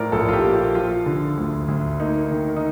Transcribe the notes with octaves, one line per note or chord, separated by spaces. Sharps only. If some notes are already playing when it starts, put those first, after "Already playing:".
Already playing: A2 F3 A#4 D5
A#1 A4
F4
G4
A#3
F4
F3 F4
D3
D2
D2
A#3 D#4
D#3
D#4